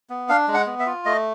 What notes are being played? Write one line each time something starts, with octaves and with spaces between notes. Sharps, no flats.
B3
D4 F5
G#3
F#5
B3
E5
F4
A3 D#5